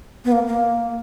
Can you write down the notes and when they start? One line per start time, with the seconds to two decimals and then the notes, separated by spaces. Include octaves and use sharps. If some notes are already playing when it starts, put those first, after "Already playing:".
0.25 B3
0.32 A#3
0.47 A#3